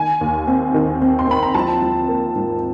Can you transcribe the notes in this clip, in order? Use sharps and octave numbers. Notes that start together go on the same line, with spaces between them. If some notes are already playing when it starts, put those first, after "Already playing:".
Already playing: D#3 G#5
D#2
C4
D#3
C4
C6
C4 B5
A#5
F3 A5
F3
A#3
G#2